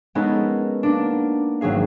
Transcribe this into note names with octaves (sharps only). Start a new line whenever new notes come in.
G#3 B3 C#4 D#4 A4 A#4
A#3 D4
G#1 F#3 C#4 G#4 F5